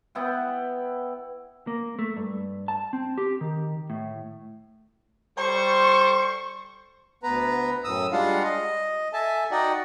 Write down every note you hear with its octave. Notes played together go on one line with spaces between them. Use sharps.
B3 E4 F#5 G5
A#3
A3
G2
A5
C4
G4
D#3
A2
G3 A4 C5 C#6
D2 B3 B4 A#5
F#2 A2 D#6 E6
G3 G#3 D4 F4 F5 F#5
D#5
A4 E5 G#5 A5
D#4 F#4 D5 D#5 F#5 G5